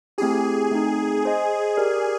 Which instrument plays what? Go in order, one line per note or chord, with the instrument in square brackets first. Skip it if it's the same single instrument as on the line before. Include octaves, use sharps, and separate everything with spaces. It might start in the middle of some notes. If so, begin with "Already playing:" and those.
[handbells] A3 C4 E4 G4 [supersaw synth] G#4
[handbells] A3 C4 D#4
G#4 C5 D#5 G#5
G4 A#4 D5